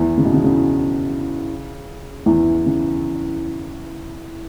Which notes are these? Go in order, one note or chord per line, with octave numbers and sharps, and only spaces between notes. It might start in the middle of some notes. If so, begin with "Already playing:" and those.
Already playing: E2 E3
C#3
B2
C#3
C#3
E2 E3
C#3